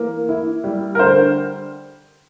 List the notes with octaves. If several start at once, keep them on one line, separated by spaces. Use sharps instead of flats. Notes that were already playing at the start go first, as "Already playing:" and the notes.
Already playing: E3 A#3
E4
G3
A#4
D3 C5